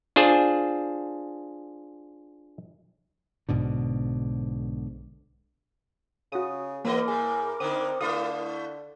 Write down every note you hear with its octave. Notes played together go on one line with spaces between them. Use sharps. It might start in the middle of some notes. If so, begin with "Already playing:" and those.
D4 F4 G#4 C5
B1 G#2 B2 D3
C#3 F#4 D#6
E3 A#3 B3 A#4 D#5 D6
A2 G#4
D3 C4 D#4 D#6
D3 A3 E4 F4 D#6